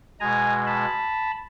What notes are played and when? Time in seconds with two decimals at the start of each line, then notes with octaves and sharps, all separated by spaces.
0.20 B2 G#3 G#5 A#5
0.66 A5 B5